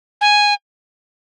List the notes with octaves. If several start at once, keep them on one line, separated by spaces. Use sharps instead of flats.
G#5